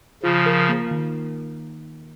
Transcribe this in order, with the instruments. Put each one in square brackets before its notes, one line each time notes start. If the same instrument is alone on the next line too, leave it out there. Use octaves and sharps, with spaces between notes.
[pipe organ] C#3 F3 [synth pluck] F4
[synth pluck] A#4
A#3
D#3